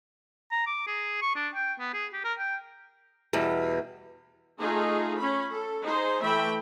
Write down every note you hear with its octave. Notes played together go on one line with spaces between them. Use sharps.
A#5
D6
G#4
C#6
D4
G5
B3
G#4
G4
A#4
G5
E2 B2 G3
A3 D#4 F4 G#4
C#4 B5
A4
D#4 G#4 C5
E3 A3 E5 G5 B5